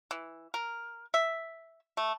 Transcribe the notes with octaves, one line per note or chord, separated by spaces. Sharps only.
E3
A#4
E5
A3